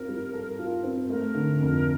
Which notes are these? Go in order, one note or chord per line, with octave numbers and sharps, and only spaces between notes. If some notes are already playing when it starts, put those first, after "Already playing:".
Already playing: C4 F4 A#4
G3
A4
F4
C4
A3 A#4
D3
F2